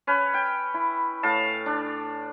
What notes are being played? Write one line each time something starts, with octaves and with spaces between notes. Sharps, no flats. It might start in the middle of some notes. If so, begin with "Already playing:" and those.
C#4 B4
G5
E4
A2 F5 A5
D4